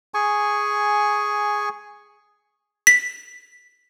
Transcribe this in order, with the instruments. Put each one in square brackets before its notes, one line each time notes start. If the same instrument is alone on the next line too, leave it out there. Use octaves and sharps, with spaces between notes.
[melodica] G#4 G#5 C#6
[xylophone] B6